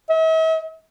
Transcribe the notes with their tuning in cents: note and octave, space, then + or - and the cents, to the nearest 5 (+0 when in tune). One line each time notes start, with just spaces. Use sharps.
E5 -45